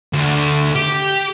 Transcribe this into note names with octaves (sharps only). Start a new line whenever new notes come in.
D2
G4